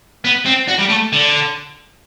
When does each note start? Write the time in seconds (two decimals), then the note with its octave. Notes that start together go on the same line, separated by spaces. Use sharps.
0.25 B3
0.46 C4
0.69 F#4
0.79 G3
0.90 A3
1.13 D3